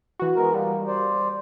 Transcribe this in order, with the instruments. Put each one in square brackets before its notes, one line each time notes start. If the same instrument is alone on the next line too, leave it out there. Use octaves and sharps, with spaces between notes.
[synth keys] E3 F#4
[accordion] G#3 B3 A#4
[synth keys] G3 [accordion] A#3
[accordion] C5 D5